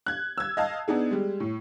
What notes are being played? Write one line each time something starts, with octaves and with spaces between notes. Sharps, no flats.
F#6 G#6
E6 G#6
D#5 F5 A5
B3 D4 D#4 G#4
G3 G#3
A2